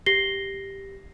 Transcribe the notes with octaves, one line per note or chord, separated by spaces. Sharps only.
G4 A#6 C7 G7